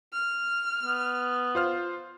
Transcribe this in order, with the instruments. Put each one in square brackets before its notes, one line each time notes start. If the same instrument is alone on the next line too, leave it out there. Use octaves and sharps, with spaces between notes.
[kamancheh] F6
[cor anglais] B3
[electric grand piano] F4 C5 F6